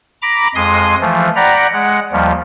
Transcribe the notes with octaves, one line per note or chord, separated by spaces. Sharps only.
A#5 B5 D6
F2 G#3 C6 D#6
E3 F3 A3
D5 F#5 G5 A#5 B5
G#3 F#5
D#2 F3 G3